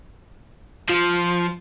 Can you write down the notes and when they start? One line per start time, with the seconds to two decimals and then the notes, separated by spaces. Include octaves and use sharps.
0.90 F3